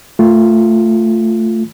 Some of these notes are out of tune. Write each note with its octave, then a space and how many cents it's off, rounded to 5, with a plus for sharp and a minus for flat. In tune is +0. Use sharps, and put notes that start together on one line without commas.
A3 +15 F4 +0